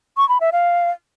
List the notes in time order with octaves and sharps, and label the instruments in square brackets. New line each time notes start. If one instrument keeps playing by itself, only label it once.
[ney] C#6
B5
E5
F5